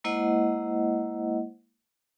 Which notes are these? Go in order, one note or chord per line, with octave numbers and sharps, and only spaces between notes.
G#3 A#3 E4 C5 D#5 F#5